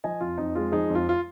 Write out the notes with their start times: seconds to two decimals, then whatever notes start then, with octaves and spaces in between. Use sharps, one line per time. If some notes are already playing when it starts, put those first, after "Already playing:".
0.04 F3 D#5 G#5
0.21 F2 F4
0.38 F2 D#4
0.55 G#3 F4
0.72 F3 D#4 G#4
0.90 F2
0.95 F4
1.09 F4